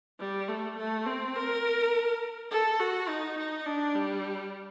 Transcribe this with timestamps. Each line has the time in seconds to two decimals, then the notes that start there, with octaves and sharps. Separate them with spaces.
0.20 G3
0.48 A3
0.78 A3
1.07 C4
1.35 A#4
2.51 A4
2.80 F#4
3.08 D#4
3.38 D#4
3.66 D4
3.95 G3